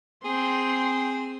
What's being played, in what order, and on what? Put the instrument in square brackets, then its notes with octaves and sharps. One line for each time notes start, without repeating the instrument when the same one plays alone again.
[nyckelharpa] C4 [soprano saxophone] G#4 [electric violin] G5 C6